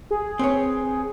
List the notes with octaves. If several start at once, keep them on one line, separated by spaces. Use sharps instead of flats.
G#4
C4 B4 C#5